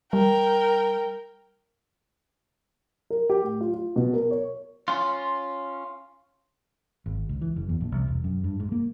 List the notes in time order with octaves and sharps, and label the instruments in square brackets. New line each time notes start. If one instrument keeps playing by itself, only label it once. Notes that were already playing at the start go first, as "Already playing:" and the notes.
[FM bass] G3 [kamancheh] A#4 G5
[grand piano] A#4
G4
A2
F4
F4
B2
A#4
C#5
[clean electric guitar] C#4 F4
[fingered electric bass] G#1
C#2
E3
F#1
E2
A#1
C2
E1
F#2
G2
G#2
A#3